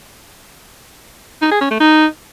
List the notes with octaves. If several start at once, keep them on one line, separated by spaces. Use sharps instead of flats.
D#4
G#4
C#4
A3
D#4